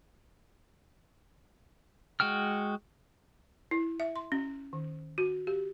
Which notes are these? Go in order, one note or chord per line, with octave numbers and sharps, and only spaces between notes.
G#3 F#4 G5 F6
E4
E5
C6
C#4
D#3
F#4
G4